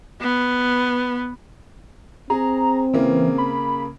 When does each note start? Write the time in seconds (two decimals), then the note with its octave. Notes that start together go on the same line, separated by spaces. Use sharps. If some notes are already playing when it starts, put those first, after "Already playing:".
0.21 B3
2.30 C4 G#4 A#5
2.93 C#3 E3 A#3
3.38 B5